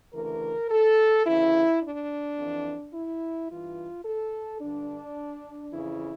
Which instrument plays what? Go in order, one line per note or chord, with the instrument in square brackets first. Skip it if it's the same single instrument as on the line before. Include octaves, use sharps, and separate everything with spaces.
[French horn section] D2 C#3 E3 A#4
A4
D2 C#3 E3 E4
D4
F2 E3
E4
G2 E3 F4
A4
G2 D3 D4
F2 C#3 E3 E4